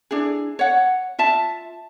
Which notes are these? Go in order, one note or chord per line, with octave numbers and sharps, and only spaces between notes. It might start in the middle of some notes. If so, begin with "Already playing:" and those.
D4 E4 G#4
C#5 F#5
F4 E5 A5